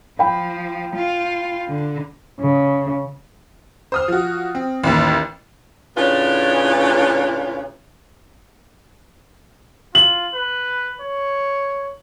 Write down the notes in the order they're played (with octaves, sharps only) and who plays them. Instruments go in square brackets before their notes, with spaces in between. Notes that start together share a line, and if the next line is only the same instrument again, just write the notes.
[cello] F3 [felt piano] G5 B5
[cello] F4
D3
[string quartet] C#3
[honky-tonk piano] C5 D#6 F6
F3 F#4
C4
A1 D#2
[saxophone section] A2 C#3 D4 F4 B4 C#5
[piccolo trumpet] F4 [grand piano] F#7
[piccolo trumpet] B4
C#5